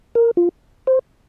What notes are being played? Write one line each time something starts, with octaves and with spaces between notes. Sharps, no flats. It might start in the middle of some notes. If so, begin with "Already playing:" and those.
A#4
F4
C5